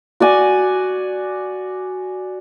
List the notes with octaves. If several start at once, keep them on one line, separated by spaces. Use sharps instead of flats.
F#4 D5 G#5